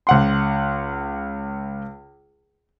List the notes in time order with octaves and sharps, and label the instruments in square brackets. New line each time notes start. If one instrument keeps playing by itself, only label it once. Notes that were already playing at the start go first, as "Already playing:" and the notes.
[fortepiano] C#2 F#5 C6